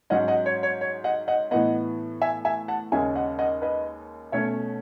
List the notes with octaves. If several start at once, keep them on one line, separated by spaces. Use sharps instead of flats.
G#2 F#3 C#4 D#5 F#5
D#5 F#5
C#5
C#5
C#5
D#5 F#5
D#5 F#5
A2 E3 B3 D#5 F#5
E5 G#5
E5 G#5
F#5 A5
D#2 C#3 G#3 C#4 E5 G#5
D#5 F#5
D#5 F#5
B4 D#5
B2 A3 C#4 C#5 E5